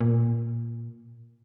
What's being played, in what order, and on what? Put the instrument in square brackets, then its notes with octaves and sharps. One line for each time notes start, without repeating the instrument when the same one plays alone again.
[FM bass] A#2